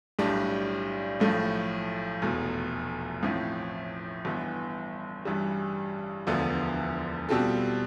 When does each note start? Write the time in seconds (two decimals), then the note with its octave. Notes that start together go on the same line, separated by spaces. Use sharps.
0.19 B1 A2 G3 D4
1.20 B1 A2 F3 A3
2.22 F1 E2 B2 A3
3.23 A1 A2 F3 C4 E4
4.25 G1 G2 E3 B3
5.25 A1 G2 E3 G3
6.27 E1 D2 D3 F3 B3
7.29 B2 G3 C4 F4 A4